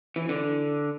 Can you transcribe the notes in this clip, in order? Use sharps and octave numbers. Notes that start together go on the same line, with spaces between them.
E3
D3